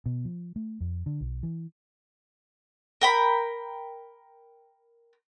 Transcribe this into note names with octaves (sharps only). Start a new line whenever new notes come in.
B2
F3
A3
F2
D3
B1
E3
A#4 G5 B5